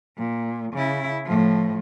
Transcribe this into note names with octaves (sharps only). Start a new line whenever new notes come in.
A#2
C#3 E4
A2 F3